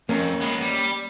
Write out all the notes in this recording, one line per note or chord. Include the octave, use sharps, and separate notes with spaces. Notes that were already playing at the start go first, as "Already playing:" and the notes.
F2 A#3 C#4 A#4
G#3 B3
G3